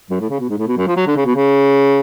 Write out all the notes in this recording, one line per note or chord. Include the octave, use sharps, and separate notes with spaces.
F#2
A2
C#3
B2
G#2
A2
B2
F#2
F3
F#3
D3
C#3
B2
C#3